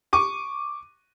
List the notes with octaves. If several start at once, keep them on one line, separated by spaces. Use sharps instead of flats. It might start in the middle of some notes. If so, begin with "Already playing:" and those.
C#6 D6 D#7